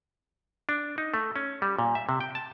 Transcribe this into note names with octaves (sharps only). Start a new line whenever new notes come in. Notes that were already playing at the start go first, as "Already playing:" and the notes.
D4
D#4
A3
C#4
G3
A#2
E5
C3
G5
A5